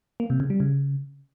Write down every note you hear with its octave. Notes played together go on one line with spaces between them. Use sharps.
A#3
C3
C#3
G3
C#3